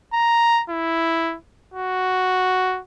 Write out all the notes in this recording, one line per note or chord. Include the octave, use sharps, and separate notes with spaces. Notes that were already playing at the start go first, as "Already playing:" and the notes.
A#5
E4
F#4